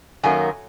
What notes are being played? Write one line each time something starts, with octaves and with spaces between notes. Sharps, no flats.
F#2 D#3 F#3 A#3 G#5